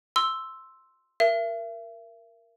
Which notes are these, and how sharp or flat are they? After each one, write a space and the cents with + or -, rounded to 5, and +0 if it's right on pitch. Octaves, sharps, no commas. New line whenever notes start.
C6 +0 E6 +0
A#4 +0 E5 +35